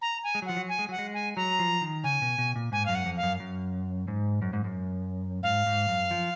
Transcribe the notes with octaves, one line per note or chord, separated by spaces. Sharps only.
A#5
G#5
G#3
F#3
F3 F#5
F#3
G#5
G#3
F#3 F#5
G#3
G#5
F#3 A#5
F3
D#3
C#3 G#5
B2
B2
A#2
G#2 G#5
F#2 F5
F#5
F2
F5
F#2
F#2
G#2
F#2
G#2
F#2
G#2 F5
G#2
F#2
F3